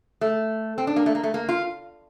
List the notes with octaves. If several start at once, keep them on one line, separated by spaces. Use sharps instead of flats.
A3
C4
D4
A#3
A3
A#3
A3
A#3
F4